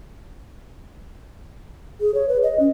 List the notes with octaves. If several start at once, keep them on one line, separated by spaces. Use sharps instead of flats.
G#4
C#5
B4
D#5
C#4